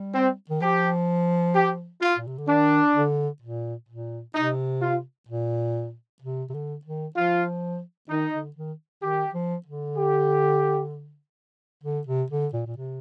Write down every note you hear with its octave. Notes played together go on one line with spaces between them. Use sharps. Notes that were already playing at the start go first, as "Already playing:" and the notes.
Already playing: G3
C4
D#3
F3 G4
G4
F4
A#2
C3
D3
D#3 D4
D3
A#2
A#2
C3 D#4
F4
A#2
C3
C3
D3
D#3
F3 F4
D#3 D#4
D3
D#3
D#3 G4
F3
D3
G4
D3
C3
D3
A#2
A#2
C3